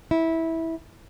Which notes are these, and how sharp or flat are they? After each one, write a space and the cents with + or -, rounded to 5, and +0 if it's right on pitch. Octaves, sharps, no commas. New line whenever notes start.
E4 -15